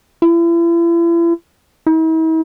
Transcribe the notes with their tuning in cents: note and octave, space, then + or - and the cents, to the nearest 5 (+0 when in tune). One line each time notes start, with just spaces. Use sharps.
E4 +40
E4 -45